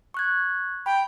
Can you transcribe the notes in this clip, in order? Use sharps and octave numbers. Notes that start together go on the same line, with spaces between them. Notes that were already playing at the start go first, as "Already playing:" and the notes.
C#6 F#6 G#6
G5 B5